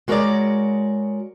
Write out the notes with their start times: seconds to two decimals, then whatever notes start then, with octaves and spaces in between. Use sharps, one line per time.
0.08 G#3 F#4 A#4 B4 C#5 D5